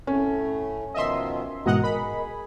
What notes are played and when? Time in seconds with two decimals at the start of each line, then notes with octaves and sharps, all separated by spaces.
0.07 A2 A3 C#4
0.94 B2 D#3 F3 D#5 E5 C6
1.66 G#2 B2 E3 F#4 A#4 D#5 F#5 A#5
1.84 G#4 A#4 D#5 B5